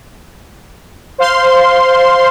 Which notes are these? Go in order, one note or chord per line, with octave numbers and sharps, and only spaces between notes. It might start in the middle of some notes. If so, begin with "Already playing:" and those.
C5 F5 C6